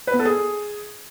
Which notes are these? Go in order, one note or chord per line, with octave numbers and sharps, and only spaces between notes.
B4
B3
A4
G#4